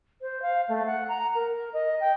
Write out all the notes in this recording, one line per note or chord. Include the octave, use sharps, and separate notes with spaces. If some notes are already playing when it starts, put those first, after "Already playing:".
C5
F5
A3
F#5
A#5
A#4
D#5
G5